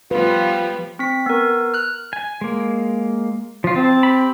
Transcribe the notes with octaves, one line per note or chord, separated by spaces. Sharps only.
F3 G3 B3 F4 B4
C4 B6
B3 A#4
F6 F#6
G#5
G#3 A#3
F3 F4
C4 A5
G4 B5